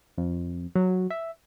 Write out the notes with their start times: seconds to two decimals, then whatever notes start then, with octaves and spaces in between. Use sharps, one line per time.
0.18 F2
0.75 F#3
1.10 E5